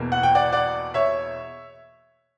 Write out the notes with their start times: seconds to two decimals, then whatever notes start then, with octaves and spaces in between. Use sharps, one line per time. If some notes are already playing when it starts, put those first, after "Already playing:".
Already playing: E2 B2 A#3
0.12 F#5
0.23 G5
0.35 D5 F#5
0.52 D5 F#5
0.94 C#5 E5